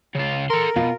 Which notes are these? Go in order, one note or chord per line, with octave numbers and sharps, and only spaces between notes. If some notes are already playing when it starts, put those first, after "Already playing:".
C#3 F4
A4 A#4 C6
B2 F4